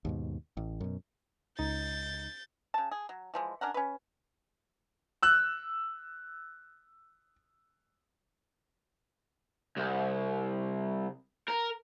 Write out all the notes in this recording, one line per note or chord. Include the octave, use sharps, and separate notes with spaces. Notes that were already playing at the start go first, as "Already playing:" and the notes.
D#2 G#2 B2
A1
F#2 B2
C#2 D#4 G6 A6
C#3 A5
G#4
F#3
E3 F3 G#3
C#4 D4 A#4 F#5
C#4 B4
E6 F#6
C2
A#4